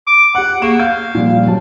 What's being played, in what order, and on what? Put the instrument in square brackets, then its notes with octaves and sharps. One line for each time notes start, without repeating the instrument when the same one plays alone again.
[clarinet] D6
[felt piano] G4 F#6 [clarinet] F#5
[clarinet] A#3 [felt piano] G#4 C#6 E7
[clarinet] F5 [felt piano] G6
[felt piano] A#2 F3 G3
F#2 F#3 A5